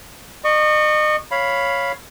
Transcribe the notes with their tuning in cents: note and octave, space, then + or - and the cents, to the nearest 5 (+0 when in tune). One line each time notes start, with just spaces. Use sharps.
D#5 -35 C#6 +0
C#5 +0 F5 +0 B5 +0